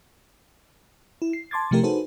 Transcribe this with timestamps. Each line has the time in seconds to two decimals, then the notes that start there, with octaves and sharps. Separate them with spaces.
1.22 E4
1.33 C7
1.51 A5 C6 D6 G#6 A6
1.71 C3 F3 A3 E4 G4 A#4
1.83 D#4 F#4 G#4 A4 B4 C5